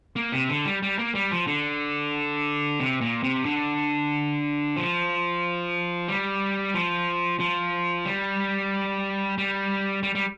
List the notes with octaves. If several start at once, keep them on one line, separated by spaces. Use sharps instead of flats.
A#3
C3
D3
G3
G3
A#3
G3
F3
D3
C3
A#2
C3
D3
F3
G3
F3
F3
G3
G3
G3
G3